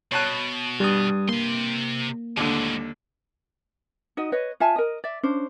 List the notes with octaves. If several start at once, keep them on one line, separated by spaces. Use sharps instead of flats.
B2 C#5 A5 F#6
G2 G3 D#6
C3 A#3 C6
D#2 A2 D3 G#3
D#4 F#4 D#5
B4 C#5 D#5
F4 E5 G#5 A5
A#4 D#5
D5 E5
C#4 D4 C5